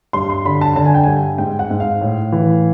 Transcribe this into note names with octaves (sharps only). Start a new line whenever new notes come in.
G2 C6
C6
D3 B5
A5
D3 A5
G#5
G5
G2 G#5
G#2 G5
F#5
G#2
F5
A2
E3